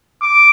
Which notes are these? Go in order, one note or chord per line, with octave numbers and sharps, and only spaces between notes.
D6